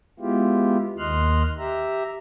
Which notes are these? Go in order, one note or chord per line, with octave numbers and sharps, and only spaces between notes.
G#3 B3 E4 F4 G4
D#2 D#3 D#5 C6 F6 F#6
G4 E5 A#5